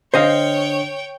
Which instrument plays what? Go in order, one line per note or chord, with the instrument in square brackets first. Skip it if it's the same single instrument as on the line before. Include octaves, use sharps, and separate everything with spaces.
[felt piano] D3 [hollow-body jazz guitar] C5 D#5 F5 [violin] C#5 G5